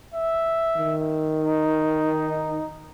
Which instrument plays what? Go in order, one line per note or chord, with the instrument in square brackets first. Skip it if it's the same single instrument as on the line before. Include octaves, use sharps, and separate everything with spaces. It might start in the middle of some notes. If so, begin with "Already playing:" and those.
[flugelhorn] E5
[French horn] D#3
[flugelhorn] D#4